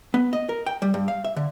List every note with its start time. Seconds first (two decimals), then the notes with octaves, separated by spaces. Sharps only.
0.14 B3
0.33 D#5
0.49 A#4
0.66 G5
0.82 G3
0.94 G2
1.08 F5
1.25 E5
1.36 D3